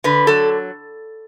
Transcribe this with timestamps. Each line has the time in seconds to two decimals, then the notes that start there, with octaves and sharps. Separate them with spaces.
0.04 D3 B4
0.27 F#3 A4